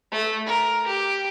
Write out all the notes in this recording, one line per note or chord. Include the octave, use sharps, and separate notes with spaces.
A3
A#4
G4